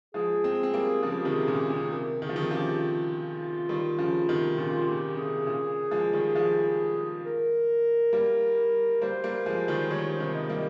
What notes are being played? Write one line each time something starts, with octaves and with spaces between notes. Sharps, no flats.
F3 G#3 G#4
G#3 C4
C4
G3 A#3
C#3 F3 A#4
G#4
G4
C3 D#3
G#4
A#2 C#3
C3
C3 A#4
D#3 G#4
F3
C3 D#3
C#3 F3 G4
F4
D#3 G3
C#3 F3
C3 D#3
A#2 C#3 F4
A#2 G4
C3 G#4
A#2 C#3
F3 G#3
D#3 G3
F3 G#3
A#4
G3 A#3
G3 A#3 C5
G3 A#3
F3 G#3
D#3 G3
D#3 G3 C#5
C5
C3 D#3
D#5
G3 A#3